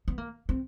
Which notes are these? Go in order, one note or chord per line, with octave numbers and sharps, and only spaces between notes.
B3
A#3
C4